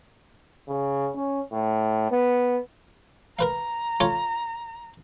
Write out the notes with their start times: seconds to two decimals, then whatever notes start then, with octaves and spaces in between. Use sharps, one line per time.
0.68 C#3
1.16 C#4
1.53 A2
2.12 B3
3.39 A#4 B4 F5 A#5
4.00 F4 A4 C#5